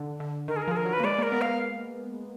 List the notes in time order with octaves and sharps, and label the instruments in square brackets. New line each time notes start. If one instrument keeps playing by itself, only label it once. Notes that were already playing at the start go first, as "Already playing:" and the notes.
Already playing: [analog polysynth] D3
D3
[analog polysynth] D#3 [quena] A#4
[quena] G#4
A#4
[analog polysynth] F3 [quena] G#4
[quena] A#4
[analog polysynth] F#3
[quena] B4
[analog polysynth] A#3
[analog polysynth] G#3 [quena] D5
[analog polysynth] A#3 [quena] A#4
[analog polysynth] B3
[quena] F5